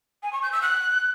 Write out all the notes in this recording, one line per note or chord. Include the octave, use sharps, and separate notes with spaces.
G#5
C#6
G6
E6
F#6